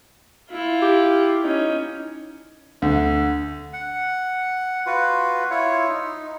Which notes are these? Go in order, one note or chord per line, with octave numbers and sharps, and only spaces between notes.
E4 F4
G4
C#4 D#4
D2
F#5
F4 F#4 B4
E4 F4 C#5
D#4